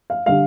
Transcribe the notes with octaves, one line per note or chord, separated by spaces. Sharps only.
F5
D3 G3 F5